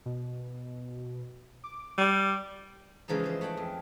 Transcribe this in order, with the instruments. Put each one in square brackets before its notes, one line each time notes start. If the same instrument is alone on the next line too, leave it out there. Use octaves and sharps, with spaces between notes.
[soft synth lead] B2
D6
[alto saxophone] G3 [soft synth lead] D6
[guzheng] C#3 E3 F3 G#3 D#4
G#3 C5
A3 C#5 F#5 G5
F2